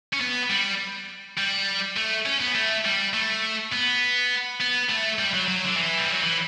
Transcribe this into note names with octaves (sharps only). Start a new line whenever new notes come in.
C#4
B3
G3
G3
A3
C#4
B3
A3
G3
A3
B3
B3
A3
G3
F#3
F#3
D3
E3
G3
F#3
E3